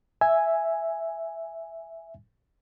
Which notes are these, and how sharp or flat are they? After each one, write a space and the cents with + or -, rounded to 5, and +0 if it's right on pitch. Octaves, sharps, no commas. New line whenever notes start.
E5 +0 G#5 +0